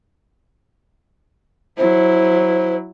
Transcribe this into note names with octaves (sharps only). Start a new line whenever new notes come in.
F#3 E4 C5